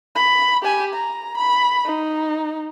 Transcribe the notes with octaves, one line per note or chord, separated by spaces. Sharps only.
B5
G4 G#5
A#5
B5
D#4